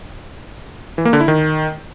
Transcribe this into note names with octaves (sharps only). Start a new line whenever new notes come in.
E3
A#3
D3
E4
D#3